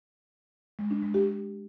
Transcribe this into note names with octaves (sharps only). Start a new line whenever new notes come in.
G#3
D4
G#3
G4